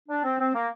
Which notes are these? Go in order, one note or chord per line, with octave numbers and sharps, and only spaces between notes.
D4
C4
C4
A#3